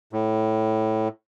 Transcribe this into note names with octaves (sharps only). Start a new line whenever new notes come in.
A2